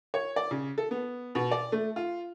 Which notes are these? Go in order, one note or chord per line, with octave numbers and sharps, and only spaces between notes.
C#5
D5
C#3
A4
B3
B2
D5
A3
F4